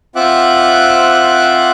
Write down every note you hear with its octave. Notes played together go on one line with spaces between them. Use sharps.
C4 F4 E5 F#5 D6 F#6